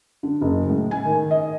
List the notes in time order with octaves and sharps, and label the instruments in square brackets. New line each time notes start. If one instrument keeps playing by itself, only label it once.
[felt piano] D3
F#1
A2
G#5
D#3
D#5